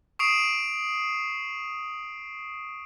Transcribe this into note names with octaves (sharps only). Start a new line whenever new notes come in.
C#6 D#6 C7 D7 F7